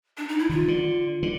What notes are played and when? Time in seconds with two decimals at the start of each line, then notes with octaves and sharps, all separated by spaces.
0.17 D4
0.28 D#4
0.39 E4
0.49 D#3 F4
0.68 D3
1.23 D3